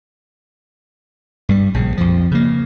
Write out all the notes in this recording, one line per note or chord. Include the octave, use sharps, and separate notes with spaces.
G2 G3
A#1 C#3
F2 F3
C#3 A#3